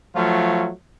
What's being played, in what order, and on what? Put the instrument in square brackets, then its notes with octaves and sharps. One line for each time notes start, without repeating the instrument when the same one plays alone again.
[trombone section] F3 F#3 A3 F4